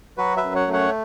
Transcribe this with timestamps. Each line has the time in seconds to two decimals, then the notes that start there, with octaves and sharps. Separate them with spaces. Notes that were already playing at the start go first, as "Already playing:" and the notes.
0.17 F#3 F#4 B4
0.37 B4 E5
0.43 F#2
0.55 C#5 F#5
0.67 A3
0.73 C#5 F#5